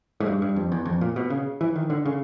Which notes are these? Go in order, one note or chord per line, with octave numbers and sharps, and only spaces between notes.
G#2
G2
G2
F2
E2
F2
A#2
B2
C#3
E3
D#3
D3
C#3